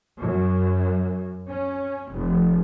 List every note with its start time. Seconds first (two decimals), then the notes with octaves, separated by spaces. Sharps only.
0.21 F#2
1.49 C#4
2.12 F1